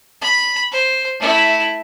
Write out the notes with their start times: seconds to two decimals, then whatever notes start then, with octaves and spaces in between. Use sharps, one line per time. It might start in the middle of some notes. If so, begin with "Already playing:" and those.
0.22 B5
0.72 C5
1.20 A3 E4